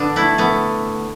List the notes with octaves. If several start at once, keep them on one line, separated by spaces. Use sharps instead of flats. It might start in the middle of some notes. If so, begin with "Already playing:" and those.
Already playing: D3 B3 D4
A3 E4
A3 B3